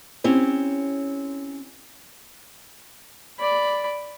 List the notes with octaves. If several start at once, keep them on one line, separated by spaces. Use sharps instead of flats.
C4 C#4 E4 G4 C#5
D5 B5